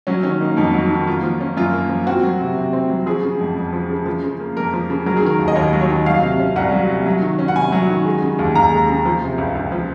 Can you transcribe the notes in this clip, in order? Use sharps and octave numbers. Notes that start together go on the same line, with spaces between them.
F#3 C#4
D#3 C#4
A#3 D#4
F2 D#4
F#3
D#3
A#3 F4
F3
C#4
F#2 F4
A#3
F3
C4 F#4
F#3
C3
C3
C4
F#3
F3 G#4
C#3
F2
F2
F3
C#3
F3
C#3
A#3
F2 A#4
F3
C#3
F#3 A#4
G#4
D#3 A#4
D#2
D#5
D#2 C#5
F#3
C#5
D#3
F#3 F5
C3
C#4
C2 F#5
F#3
C3
F#3
D#3
C#4
F#5
C3 G#5
F#3
D#3
G#3
C#3
D#2
D#2 A#5
G#3
C#3
F3
C3
C#2
C#2
F3